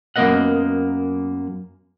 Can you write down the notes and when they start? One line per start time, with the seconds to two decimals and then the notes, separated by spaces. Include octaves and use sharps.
0.16 F#2 A#3 B3 A#4 D#5 F#5